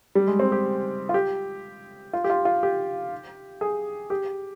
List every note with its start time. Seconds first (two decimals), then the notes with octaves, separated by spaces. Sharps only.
0.15 G3
0.27 G#3
0.40 C4
0.52 G4
1.09 F4
1.14 G4
2.13 F4
2.24 G4
2.30 F4
2.45 F4
2.63 G4
3.61 G#4
4.10 G4